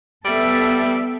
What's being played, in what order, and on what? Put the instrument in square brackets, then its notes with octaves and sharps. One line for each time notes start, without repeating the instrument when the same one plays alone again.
[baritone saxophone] G3 [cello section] B3 A4 E5